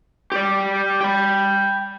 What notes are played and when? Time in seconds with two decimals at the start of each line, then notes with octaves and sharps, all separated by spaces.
0.32 G4 D5
1.01 G5 B5